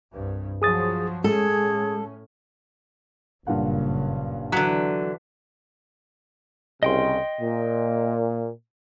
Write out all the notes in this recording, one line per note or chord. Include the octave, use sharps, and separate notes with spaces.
C2 G2
F3 F#3 G#4 D#6 A6
A2 G#3 C#4 G#4 A4
F#1 G2 A#2 C#3 F#5
D3 E3 F#3 B6
C2 C#3 D#5 G5 C6
A#2